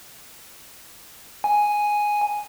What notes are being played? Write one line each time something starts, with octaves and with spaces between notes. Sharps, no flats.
G#5